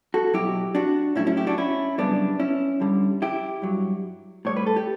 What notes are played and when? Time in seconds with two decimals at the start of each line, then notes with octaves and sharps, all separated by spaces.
0.14 F#4 A4
0.33 B2 F#3 E4 G4
0.75 D4 F#4
1.15 A2 F#3 C#4 E4
1.27 C#4 E4
1.37 E4 G4
1.47 D4 F#4
1.58 C#4 E4
1.98 F#2 C#3 G3 B3 D4
2.40 C#4 E4
2.80 G2 D3 G3
3.22 E4 G4
3.62 G2 F#3
4.45 A2 G3 C#5
4.57 B4
4.66 A4
4.76 G4